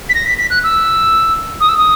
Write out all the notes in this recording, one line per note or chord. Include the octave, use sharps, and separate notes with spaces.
B6
A#6
B6
B6
F#6
E6
D#6
E6
D#6